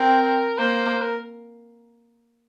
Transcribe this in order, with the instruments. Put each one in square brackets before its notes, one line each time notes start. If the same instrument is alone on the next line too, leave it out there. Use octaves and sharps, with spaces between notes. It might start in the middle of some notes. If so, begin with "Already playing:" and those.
Already playing: [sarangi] C4 [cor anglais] A#4
[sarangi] A#3 [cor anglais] C5
[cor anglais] A#4